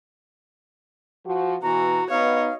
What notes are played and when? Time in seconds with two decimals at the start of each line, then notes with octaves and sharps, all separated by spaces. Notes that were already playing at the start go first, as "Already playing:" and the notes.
1.25 F3 F#4
1.63 B2 E3 F#4 A#5
2.10 B3 D#4 C#5 D#5 F5